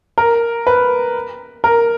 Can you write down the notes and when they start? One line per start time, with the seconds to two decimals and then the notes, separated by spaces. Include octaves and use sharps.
0.18 A#4
0.67 B4
1.64 A#4